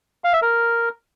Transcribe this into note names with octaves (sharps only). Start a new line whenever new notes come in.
F5
E5
A#4